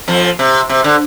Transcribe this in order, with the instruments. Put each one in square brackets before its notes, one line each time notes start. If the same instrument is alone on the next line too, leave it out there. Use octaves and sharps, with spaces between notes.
[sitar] F2 F3
C3
C3
D3